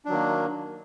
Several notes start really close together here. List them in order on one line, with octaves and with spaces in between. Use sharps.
D4 F#3 D#3 A#3